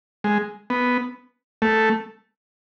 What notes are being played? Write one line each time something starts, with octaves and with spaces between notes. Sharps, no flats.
G#3
B3
A3